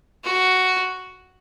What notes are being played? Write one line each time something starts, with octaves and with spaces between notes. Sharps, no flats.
F#4